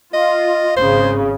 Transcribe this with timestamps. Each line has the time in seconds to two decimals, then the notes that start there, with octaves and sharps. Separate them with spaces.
0.14 F4 D#5
0.77 G#1 C#3 C5